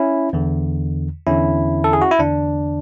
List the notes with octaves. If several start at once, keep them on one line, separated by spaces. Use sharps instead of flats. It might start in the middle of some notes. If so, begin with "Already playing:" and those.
Already playing: C#4 E4
E2 D3
E2 D3 C#4 E4
A4
G#4
F#4
E4
E2 D3 D4